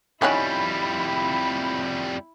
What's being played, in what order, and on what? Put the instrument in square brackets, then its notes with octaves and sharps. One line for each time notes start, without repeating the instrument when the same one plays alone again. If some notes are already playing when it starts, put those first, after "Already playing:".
[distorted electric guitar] F2 G3 [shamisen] D#3 C#4 F#5 [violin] E4 [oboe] B5